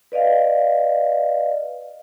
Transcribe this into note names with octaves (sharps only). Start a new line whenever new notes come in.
B4 D5 D#5 F5